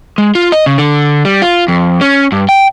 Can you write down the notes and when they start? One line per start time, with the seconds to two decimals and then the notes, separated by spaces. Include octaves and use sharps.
0.18 G#3
0.35 F4
0.52 D#5
0.66 C#3
0.78 D3
1.25 G3
1.42 F4
1.68 F2
2.01 C#4
2.32 G2
2.49 G5